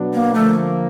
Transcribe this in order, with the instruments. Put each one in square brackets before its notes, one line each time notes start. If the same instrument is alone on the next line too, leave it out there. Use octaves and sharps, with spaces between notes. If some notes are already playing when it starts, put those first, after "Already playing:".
Already playing: [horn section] B2 F#3 B3 D4
[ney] A#3
[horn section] D3 F3 A#3 [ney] A3